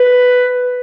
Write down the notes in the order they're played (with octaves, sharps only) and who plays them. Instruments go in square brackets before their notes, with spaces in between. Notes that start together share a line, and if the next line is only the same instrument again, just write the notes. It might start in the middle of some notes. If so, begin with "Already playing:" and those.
Already playing: [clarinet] B4